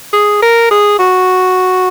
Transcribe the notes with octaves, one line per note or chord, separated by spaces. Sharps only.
G#4
A#4
G#4
F#4